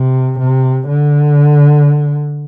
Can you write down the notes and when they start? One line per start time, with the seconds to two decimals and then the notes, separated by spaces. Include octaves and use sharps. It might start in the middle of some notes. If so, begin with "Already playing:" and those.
Already playing: C3
0.39 C3
0.88 D3